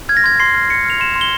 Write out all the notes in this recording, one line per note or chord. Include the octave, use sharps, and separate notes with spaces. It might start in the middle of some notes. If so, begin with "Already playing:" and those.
F6 G#6
A#6
C6 G#6
C6 C7
F6
F6 C#7
F6 F7
C6 E7
C6
G7